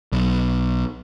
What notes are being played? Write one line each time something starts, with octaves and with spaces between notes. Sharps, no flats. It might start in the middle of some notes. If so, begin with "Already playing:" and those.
B1